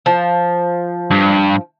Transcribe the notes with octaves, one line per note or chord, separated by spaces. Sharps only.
F3
G2